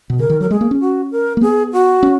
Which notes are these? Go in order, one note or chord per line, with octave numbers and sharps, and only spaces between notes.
B2
C#3 A#4
D#3
F#3 A#4
G#3 G#4
A#3
C#4
F#4
A#4
A#3
B3 G#4
F#4
C#4